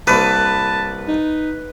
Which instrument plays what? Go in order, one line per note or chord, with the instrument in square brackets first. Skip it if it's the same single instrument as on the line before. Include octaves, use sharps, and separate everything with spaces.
[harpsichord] C2 A#3 [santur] B4 [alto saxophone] A5
[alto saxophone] D#4